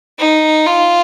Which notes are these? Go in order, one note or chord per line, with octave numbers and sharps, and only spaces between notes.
D#4
F4